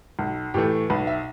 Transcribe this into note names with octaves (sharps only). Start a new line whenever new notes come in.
B1
A2 E3 A3 G4
B1 B4
E5